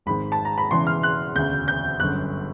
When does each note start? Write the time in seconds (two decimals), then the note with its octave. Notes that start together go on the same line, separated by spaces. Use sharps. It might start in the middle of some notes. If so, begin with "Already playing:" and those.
0.06 G#1 G#2 D#3 B5
0.32 A5
0.45 A#5
0.58 B5
0.71 E1 E2 C#3 E3 C6
0.87 F6
1.03 F#6
1.36 E1 D2 C#3 G6
1.68 G6
2.00 G1 F#2 D3 F#6